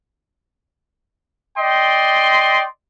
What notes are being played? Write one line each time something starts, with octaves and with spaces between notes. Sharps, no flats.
D5 D#5 G5 C6